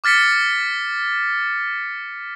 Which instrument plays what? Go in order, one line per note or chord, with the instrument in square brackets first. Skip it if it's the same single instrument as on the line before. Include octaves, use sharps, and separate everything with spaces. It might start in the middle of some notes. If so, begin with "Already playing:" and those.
[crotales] D6 F6 A6 B6 C#7